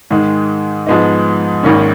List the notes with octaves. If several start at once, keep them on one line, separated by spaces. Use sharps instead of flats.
G#2 D#3 G#3
G#2 F3 G#3 B3 D#4
G#1 G#2 D#3 A#3 C#4